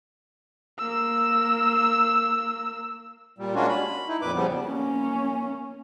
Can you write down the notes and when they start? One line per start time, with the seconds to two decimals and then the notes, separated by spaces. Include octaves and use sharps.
0.79 A#3 E6
3.38 A#2 G3
3.55 G#3 A#3 C#4 D4 F4 F#4
3.68 B5
4.08 D#4 E4
4.22 F2 A#2 B4 D6
4.35 C#3 F3 G3 B3
4.64 A#3 C#4